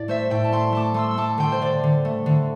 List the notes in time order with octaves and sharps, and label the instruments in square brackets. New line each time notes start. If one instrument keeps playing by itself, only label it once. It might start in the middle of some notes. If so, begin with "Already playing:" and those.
Already playing: [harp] A2 D5
A3 C5 E5
A2 D5 G5
A5
A3 G5 C6
A3 A5 D6
A3 C6 E6
E6
A3 A5 D6
D3 G5 C6
C5
D3 D5
D3
A3
D3